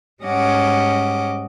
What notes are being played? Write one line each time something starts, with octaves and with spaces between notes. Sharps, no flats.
G#2 G3 C#4 D#5 F#5 D6